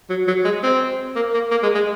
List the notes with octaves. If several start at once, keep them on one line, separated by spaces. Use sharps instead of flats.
F#3
F#3
G#3
C4
A#3
A#3
A#3
G#3
G#3